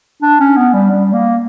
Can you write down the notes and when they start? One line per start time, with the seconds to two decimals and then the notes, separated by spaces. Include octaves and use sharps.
0.22 D4
0.40 C#4
0.57 B3
0.74 G3
0.91 G3
1.13 A#3